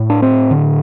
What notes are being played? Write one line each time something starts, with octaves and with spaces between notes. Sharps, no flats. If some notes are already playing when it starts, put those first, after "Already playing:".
Already playing: A2
D4
C4
D3